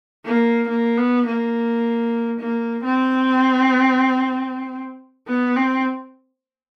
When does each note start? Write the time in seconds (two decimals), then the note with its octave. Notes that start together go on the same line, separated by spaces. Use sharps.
0.25 A#3
0.68 A#3
0.97 B3
1.26 A#3
2.40 A#3
2.84 C4
5.28 B3
5.56 C4